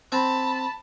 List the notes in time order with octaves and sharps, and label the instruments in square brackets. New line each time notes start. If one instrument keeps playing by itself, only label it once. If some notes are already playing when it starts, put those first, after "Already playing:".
[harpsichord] C4 [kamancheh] A5 B5